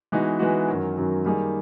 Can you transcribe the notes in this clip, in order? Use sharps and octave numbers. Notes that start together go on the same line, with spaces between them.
E3 G#3 B3 D#4 F#4
E3 G#3 B3 D#4 F#4
F#2 D#3 F#3
F#2 D#3 F#3
D#3 G3 A#3 D#4 G#4